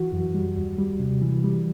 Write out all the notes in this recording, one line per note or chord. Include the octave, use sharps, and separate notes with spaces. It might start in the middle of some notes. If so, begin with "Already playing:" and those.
Already playing: E3 F#4
F#2
G3
D#2
G3
C3
E3
G3